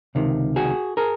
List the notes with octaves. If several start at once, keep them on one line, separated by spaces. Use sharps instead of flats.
C#2 C3 D#3
F#4 G#4
G#4 A#4